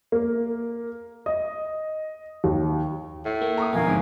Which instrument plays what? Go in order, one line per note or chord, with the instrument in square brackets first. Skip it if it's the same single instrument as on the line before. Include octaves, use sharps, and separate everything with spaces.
[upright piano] A#3
D#5
D#2
[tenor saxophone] A2
[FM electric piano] A#3
[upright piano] A#5 C#6 D#6
[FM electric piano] F2 B3 [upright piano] B2 D#3 [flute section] A#4 F5 G#5
[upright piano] G1 G#2